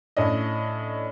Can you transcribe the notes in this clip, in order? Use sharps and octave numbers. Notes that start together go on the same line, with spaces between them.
A2 C#4 D4 D#5